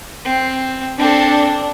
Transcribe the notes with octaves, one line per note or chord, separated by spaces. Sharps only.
C4
C4 D4 A4